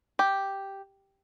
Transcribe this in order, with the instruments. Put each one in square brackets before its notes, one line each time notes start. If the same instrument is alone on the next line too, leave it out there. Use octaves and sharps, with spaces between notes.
[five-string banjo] G4